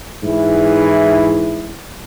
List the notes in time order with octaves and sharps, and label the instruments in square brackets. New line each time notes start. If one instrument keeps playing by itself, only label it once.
[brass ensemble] G#2 E3 E4 G#4